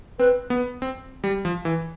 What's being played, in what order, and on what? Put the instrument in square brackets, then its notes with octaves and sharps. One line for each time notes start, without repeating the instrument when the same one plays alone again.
[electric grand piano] C4 [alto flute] B4
[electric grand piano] B3
C4
G3
F3
E3